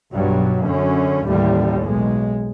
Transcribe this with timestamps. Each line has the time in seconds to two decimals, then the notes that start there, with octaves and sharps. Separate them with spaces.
0.13 B1 G2 F#3
0.63 F#2 D3 C#4
1.27 A1 D#2 A2 G3
1.82 B1 G#3